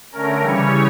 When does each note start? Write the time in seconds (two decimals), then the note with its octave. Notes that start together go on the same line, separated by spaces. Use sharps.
0.12 D3 A3 C#4 A#4
0.42 C#3 E3 G3 C#4 C#5